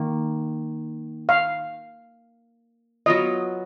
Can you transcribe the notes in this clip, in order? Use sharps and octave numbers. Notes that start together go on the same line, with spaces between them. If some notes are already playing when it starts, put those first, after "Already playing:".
Already playing: D#3 A#3
F5
F#3 B3 F4 D#5